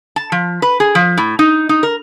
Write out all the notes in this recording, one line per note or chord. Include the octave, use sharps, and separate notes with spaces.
A5
F3
B4
G#4
F3
A2
D#4
D#4
A#4